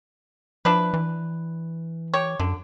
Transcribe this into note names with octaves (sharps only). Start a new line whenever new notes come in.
F3 D4 E4 B4
E3
G4 C#5
F#2 D3